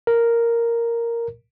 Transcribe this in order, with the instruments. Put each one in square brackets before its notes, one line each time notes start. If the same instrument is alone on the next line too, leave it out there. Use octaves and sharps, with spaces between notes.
[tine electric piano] A#4